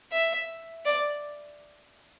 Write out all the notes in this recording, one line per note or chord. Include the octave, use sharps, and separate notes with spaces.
E5
D5